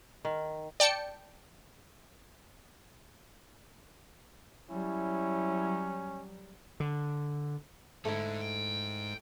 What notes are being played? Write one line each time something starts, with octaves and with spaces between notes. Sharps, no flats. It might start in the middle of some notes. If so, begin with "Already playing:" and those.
D#3
D5 G5 A5 C#7
F#3 G3 C#4 E4
D3
G#2 D3 A3 E4
G5